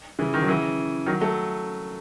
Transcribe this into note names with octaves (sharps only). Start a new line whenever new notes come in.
C#3 E3
D#3
F#3
C#3 E3
D#3 F#3
F#3 A3